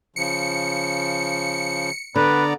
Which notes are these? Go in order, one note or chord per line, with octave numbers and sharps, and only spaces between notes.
C#3 F3 C#7
D3 B3 B4 D5 A#5